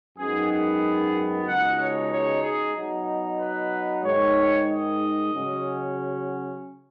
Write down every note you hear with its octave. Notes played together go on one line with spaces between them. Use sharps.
F#2 D#3 G#3 B3 D#4 G#4
G#4
C#2 B2 G#3 D#4 F#5
C#5
C#5
G#4
B2 F#3 D#4
B4
G#2 D#3 G#3 D#4 C#5
D#5
C#3 F#3 C#4